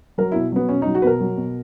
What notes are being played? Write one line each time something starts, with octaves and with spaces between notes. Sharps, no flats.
F#3 A#4
B2 E4
F#3 B3
B2 C#4
F#3 D#4
F#4
B2 A#4 B4
F#3
B2